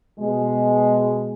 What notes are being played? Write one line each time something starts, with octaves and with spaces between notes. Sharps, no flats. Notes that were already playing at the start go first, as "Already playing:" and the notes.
B2 G#3